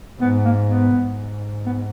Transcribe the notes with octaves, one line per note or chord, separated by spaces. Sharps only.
G#2 B3
A#3
B3
G#2
B3